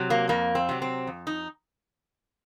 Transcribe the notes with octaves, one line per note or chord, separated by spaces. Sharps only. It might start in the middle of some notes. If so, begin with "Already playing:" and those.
Already playing: C3 F#3
A#3
F2 A#3
C4
C3 F#3
C4
F2
D#4